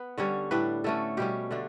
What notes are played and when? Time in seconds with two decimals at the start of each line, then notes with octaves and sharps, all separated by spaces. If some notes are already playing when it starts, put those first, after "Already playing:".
Already playing: B3 B4
0.18 D3 G3 C#4 C#5
0.51 A2 G3 D4 B4
0.84 D3 A3 C#4 A4
1.17 B2 G3 C#4 G4
1.51 D3 A3 D4